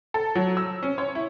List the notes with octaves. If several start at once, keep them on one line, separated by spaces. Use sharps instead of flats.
A4
F#3
E6
C#4
C#5
E4